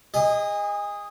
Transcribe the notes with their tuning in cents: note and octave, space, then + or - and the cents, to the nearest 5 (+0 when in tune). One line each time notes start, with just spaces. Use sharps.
G#4 -30 D#5 +0